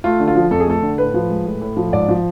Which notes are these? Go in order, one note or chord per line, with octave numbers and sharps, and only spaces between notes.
A3 F4
D3
F4
F3
F2 A4
G#4
A3 A4
D3
A2 B4
F3
G#3
A2
A2
F3
G#2 D5
F3